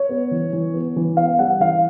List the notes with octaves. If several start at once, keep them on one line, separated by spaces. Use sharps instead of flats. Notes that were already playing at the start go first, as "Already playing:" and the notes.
Already playing: C#5
B3
E3
E3
B3
E3
B3 F5
G3 F#5
E3 F5